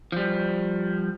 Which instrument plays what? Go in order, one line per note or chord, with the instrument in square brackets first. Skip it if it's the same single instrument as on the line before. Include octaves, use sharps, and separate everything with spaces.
[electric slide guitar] F3 G3